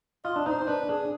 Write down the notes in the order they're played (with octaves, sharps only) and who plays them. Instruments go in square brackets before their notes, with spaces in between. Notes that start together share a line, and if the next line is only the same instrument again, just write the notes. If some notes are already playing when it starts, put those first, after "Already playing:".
[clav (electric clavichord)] F4 [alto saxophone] D#5
[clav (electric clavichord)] D4
[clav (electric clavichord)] D#4 [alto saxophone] C5
[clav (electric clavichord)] D4 [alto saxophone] B4
[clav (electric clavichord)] D4 [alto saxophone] G#4